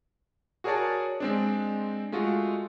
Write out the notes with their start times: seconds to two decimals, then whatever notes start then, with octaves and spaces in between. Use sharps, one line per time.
0.64 F#4 G#4 A#4 C#5 D5 A5
1.20 G#3 C4 D4
2.12 G#3 A3 F4 F#4